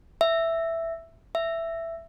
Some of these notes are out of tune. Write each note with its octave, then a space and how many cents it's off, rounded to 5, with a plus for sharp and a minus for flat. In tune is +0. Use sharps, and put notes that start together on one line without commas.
E5 +5
E5 +10